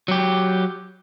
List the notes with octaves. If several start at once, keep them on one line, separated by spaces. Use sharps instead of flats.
F#3 G4